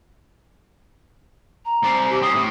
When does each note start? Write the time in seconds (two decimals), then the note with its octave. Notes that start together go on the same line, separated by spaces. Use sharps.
1.65 A#5
1.83 C4 D5
2.10 G4
2.22 C4 C#4 D#6
2.34 A2